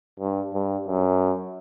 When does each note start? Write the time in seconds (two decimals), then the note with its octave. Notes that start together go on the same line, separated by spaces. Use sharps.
0.20 G2
0.53 G2
0.87 F#2